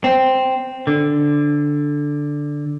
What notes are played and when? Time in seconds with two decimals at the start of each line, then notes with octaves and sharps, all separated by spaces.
0.04 C4
0.87 D3